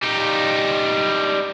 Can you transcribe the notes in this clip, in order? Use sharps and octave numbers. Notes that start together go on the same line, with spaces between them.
G3 D#4